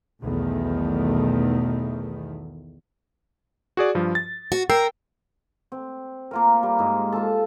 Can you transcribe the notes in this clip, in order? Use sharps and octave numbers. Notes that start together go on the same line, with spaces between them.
B1 E2 D#3 A3
F#4 G#4 D5
G2 F3
A6
F#4
A#4 G5 E6 C7
C4
A#3 F4 A#4
G3 A#3
G#2 G#3
F4 A4